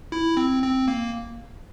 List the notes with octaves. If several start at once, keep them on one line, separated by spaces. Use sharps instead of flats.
E4
C4
C4
A#3